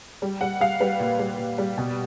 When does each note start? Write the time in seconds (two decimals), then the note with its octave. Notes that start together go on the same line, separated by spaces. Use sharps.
0.22 G3
0.41 G3 F#5
0.60 G3 F5
0.80 G3 B4
1.00 A#2
1.19 G3
1.38 A#2
1.58 G3
1.77 B2